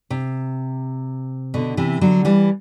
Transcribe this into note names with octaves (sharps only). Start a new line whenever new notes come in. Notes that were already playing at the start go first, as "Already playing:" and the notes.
C3
B2 D3
C3 E3
D3 F#3
E3 G3